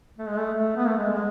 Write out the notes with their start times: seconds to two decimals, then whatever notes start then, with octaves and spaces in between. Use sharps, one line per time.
0.18 A3
0.29 G#3
0.39 A3
0.53 A3
0.76 B3
0.87 A3
0.97 G#3
1.12 G#3